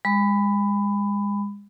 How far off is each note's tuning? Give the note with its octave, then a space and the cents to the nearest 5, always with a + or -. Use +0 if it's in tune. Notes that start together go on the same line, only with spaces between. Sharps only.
G#3 -35 B5 +20